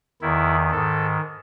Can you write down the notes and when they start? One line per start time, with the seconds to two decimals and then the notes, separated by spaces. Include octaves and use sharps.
0.21 E2 D#3 E4
0.71 G#2 D#3 A4